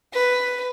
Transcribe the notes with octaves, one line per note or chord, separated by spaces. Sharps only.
B4